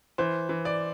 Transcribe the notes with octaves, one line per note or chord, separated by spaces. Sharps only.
E3 C5
E3
D5